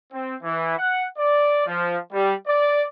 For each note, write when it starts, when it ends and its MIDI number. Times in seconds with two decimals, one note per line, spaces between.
0.13 0.35 60
0.43 0.74 52
0.78 1.06 78
1.18 1.65 74
1.66 1.98 53
2.13 2.34 55
2.48 2.85 74